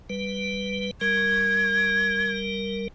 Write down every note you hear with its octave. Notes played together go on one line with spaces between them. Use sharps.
G3 B4
G3 A#4 G#6